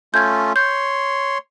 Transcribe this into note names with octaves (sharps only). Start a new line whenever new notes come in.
A3 C#4 F4 G6 G#6
C#5 C6 G6